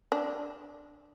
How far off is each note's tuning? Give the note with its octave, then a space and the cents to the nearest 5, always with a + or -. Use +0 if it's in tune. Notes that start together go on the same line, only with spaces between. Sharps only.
D4 +5